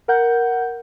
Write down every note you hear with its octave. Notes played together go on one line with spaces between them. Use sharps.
A#4 F#5 G6